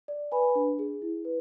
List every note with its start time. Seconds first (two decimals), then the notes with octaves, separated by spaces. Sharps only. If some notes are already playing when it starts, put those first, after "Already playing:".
0.08 D5
0.32 B4 G#5 B5
0.55 D4
0.79 G#4
1.02 E4
1.25 B4